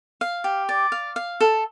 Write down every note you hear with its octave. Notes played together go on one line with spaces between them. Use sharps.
F5
G4
D5
F5
F5
A4